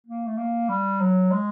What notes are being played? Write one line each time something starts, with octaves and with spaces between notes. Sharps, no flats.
A#3
A3
A#3
G3
F#3
G#3